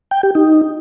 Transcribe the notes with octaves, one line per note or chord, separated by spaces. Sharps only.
G5
G4
D#4